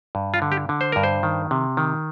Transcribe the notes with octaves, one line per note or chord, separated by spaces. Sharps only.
G2
F4
D3
G4
D3
C5
G2 A#4
C5
D#3
C3
D#3